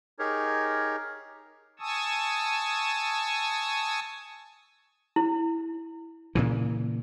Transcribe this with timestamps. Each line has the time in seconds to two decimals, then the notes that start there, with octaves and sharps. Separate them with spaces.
0.19 D#4 G4 G#4 A#4 C#5
1.79 G#5 A5 C#6 D#6 E6
5.16 E4
6.35 A#2 C#3 E3